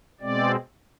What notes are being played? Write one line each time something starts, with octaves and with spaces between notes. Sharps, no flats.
B2 G#3 C4 D5